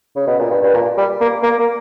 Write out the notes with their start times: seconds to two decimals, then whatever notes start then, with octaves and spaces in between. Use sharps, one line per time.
0.16 C#3
0.27 B2
0.39 A#2
0.51 G2
0.63 G2
0.74 A#2
0.97 G3
1.21 A#3
1.43 A#3
1.59 A#3